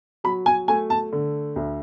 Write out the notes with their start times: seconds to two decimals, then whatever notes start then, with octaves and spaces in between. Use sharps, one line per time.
0.24 F#3 B5
0.46 G#5
0.68 A3 G#5
0.90 A5
1.12 D3
1.56 D2